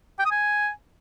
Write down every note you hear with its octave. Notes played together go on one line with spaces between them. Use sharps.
G5
D#6
G#5